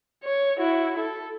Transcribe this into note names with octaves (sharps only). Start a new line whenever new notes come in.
C#5
E4 F#4
A4